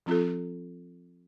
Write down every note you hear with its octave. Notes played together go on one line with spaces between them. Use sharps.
F3 C4 F4 A4